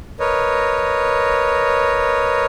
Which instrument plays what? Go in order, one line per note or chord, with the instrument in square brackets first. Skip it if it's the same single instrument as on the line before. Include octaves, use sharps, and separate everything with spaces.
[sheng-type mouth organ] A#4 B4 C#5 D#5